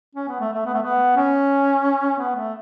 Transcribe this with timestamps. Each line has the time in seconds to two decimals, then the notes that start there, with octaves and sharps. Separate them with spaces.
0.15 C#4
0.28 B3
0.41 A3
0.53 A3
0.66 B3
0.74 A3
0.82 B3
1.17 C#4
2.18 B3
2.36 A3